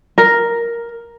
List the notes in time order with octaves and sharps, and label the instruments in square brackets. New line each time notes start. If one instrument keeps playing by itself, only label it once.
[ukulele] A#4